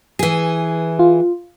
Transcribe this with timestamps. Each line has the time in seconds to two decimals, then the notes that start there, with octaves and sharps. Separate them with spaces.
0.19 E3 G#4
0.99 F4